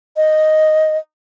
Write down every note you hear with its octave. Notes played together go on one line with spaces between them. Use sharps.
D#5